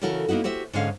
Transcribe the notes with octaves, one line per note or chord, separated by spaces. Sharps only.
C#3 E3 F#4 A4 A#4
A#3 B3 D#4 E4 F#4
F#4 G4 C5 E5
G#2 D3 G#3 C#4 F5